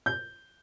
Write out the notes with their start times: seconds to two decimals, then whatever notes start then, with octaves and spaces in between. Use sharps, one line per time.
0.06 G6